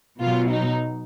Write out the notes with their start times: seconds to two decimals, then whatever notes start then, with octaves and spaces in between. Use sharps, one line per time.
0.20 B2 F#3 F4
0.50 D#4